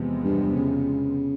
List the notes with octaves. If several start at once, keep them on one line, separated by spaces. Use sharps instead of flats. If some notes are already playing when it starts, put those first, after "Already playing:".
Already playing: E2 C3 F3 G#3 B3
G2
C#3